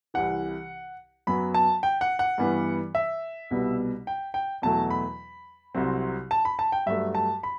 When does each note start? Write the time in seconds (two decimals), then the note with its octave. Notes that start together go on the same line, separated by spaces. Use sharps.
0.14 C2 C3 E3 F#5
1.27 F#2 F#3 B3 B5
1.54 A5
1.83 G5
2.01 F#5
2.19 F#5
2.38 G2 E3 G3 B3
2.95 E5
3.51 C2 B2 G3 B3
4.07 G5
4.34 G5
4.62 E2 B2 F#3 A3 A5
4.90 B5
5.75 C2 C3 F#3 C4
6.31 A5
6.45 B5
6.59 A5
6.72 G5
6.86 G2 F#3 A3 E5
7.15 A5
7.43 B5